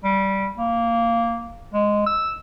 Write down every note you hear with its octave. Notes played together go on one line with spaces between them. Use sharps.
G3
A#3
G#3
E6